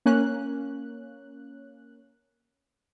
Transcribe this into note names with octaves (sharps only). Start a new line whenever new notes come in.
A#3 C#4 F#6